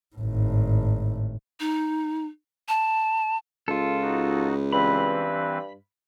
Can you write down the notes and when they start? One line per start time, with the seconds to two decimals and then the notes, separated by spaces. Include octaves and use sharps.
0.16 G#1 A2
1.60 D#4
2.68 A5
3.68 C#2 F4 A4
4.02 D#4 F#4
4.72 G2 E3 C4 B4 B5